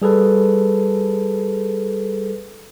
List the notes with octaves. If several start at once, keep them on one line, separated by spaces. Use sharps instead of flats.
G3 G#4 A4 B4